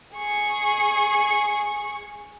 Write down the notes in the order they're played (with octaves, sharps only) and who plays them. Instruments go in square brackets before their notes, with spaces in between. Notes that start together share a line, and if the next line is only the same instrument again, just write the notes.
[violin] G#4 C#6